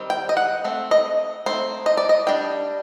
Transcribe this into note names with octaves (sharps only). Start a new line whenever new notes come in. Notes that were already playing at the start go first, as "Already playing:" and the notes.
Already playing: D#3 G3 C4
G5
D#5
F#5
A3 C4
D#5
A3 C4 D#4 C5
D#5
D5
D#5
G3 D4 G5